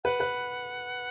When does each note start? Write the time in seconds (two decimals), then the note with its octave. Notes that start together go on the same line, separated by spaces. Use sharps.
0.04 B4 F#5
0.20 B4